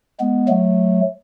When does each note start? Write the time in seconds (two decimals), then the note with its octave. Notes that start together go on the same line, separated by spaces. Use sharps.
0.20 G#3 B3
0.48 F#3 A3